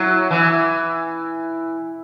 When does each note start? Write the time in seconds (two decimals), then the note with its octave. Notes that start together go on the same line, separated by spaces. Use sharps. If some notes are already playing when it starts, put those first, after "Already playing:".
Already playing: F#3 E4
0.31 E3